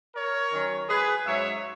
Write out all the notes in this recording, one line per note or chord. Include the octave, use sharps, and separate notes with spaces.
A#4 C#5
D#3 F#3 C#4
G#4 B4
G#2 F#3 C#4 C#5 E5